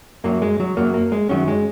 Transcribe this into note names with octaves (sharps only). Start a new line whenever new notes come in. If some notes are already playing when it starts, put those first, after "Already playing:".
F#2 F#3 A#3
G#3
F#3
F#2 F#3 A#3
A#3
G#3
F#2 D#3 F#3 C#4
G#3